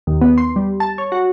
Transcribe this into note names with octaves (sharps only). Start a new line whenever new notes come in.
D#2
B3
C6
G3
A5
C#5
F#4